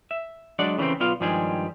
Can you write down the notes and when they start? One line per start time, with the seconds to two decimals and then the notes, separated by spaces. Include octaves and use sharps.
0.11 E5
0.59 F#3 G#3 D4 D5 F#5
0.78 C#3 E3 A3 C4
1.00 B1 B3 F4 D5 F5
1.20 G2 D#3 F3 G3 G#3 G#4